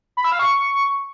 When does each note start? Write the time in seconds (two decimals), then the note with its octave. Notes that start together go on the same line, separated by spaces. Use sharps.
0.17 B5
0.24 E6
0.32 F5
0.39 C#6